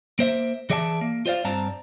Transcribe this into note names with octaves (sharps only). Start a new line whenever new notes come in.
A#3 C5 E5
E3 G#4 D5 E5 F5 A5
A#3
F4 C5 D5 F5
G2 C4 D5 A5 A#5